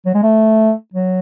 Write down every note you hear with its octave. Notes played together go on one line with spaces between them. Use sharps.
F#3
G#3
A3
F#3